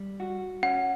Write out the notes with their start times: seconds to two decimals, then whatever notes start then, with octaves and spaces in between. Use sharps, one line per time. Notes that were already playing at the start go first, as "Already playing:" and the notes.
Already playing: G3
0.20 F#4
0.63 C#4 F#5